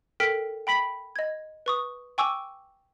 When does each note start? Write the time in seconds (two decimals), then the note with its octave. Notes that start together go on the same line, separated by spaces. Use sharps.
0.20 A4 A#4 G5 F6 B6 D7
0.67 G5 B5 B6 F#7
1.16 D#5 G#6
1.66 B4 C#6 D#6
2.18 G5 G#5 C#6 D6 E6